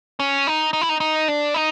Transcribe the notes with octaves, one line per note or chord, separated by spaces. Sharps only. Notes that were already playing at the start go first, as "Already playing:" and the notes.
C#4
D#4
D#4
E4
D#4
D#4
D4
D#4